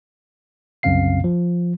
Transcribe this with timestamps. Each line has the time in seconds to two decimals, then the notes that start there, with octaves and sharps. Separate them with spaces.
0.83 C2 F#2 C#3 C4 F5 C7
1.24 F3